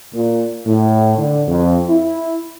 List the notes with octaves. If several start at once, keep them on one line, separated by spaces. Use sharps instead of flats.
A#2
A2
D3
F2
E4